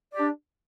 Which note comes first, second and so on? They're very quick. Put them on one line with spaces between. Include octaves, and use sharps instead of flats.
D5 G4 D4